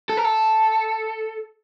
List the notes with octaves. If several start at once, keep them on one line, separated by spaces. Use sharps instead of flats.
A4
A#4
A4